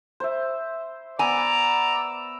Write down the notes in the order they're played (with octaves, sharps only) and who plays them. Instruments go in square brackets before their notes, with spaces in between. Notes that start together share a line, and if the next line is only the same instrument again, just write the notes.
[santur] C5 E5
[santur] B3 [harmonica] D5 D6 E6 [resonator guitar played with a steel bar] G#5 [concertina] A#5